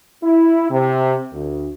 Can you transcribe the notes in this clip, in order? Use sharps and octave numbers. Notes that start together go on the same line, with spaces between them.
E4
C3
D2